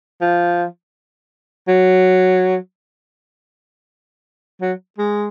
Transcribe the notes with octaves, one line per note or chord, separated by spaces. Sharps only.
F3
F#3
F#3
G#3